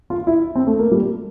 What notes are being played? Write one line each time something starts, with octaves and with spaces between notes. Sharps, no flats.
F4
E4
C4
A3
A#3
G3